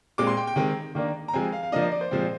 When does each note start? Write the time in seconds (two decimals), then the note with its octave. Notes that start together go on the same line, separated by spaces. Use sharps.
0.18 A#2 G#3 C4 D6
0.27 C6
0.37 G5
0.47 G5
0.56 D#3 G#3 C4
0.95 D#3 A#3 D4
1.28 A#5
1.33 F3 G#3 C4 G#5
1.52 F5
1.63 F5
1.72 F3 A#3 D4 D#5
1.82 D#5
1.92 D5
2.01 C5
2.11 A#2 F3 G#3 C4